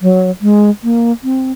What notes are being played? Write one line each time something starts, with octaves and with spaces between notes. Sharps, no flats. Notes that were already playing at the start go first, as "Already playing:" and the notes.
F#3
G#3
A#3
C4